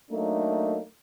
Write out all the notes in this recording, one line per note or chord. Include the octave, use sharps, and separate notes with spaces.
F#3 A3 A#3 D4 D#4